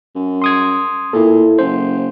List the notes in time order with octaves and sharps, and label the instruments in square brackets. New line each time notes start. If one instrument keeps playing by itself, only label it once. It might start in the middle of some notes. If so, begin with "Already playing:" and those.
[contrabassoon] F#2
[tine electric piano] C6 D#6 G#6
[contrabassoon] A#2 [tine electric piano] E4 A4
[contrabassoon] F#1 [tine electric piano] C5